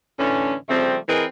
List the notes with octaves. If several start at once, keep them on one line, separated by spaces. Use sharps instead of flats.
A2 D3 E3 C#4
C#3 F3 G3 A3 C4
E3 C4 G#4 A#4 B4 D#5